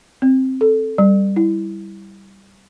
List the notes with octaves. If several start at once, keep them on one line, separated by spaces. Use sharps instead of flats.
C4
A4
G3
E4